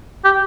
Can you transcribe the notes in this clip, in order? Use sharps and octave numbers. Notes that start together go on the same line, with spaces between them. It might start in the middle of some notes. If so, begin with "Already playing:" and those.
G4